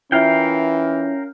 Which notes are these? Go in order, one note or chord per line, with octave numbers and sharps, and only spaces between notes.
E3 C#4 E4 F4 A#4 E5 F5 G5